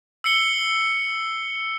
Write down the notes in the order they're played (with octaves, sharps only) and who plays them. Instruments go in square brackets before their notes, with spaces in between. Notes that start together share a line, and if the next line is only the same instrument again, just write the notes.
[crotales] E6 C7 C#7 G7